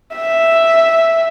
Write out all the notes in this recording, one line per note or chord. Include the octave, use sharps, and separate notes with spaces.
E5